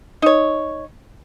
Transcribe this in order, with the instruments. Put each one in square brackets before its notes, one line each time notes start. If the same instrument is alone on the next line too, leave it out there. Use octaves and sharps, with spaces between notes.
[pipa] D#4 C#5